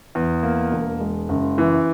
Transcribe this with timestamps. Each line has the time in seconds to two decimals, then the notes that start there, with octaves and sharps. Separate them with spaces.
0.15 E2
0.43 A#3
0.72 E1
1.00 G#3
1.29 F#1
1.58 E3